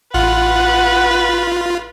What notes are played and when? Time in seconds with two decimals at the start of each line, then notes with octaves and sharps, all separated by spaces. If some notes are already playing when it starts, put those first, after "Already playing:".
0.14 A1 F4 B4 F#5